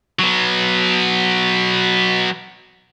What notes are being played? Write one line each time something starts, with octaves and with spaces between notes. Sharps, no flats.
F#3 B3